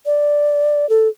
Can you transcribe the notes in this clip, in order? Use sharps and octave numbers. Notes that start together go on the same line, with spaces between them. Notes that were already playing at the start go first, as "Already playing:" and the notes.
D5
A4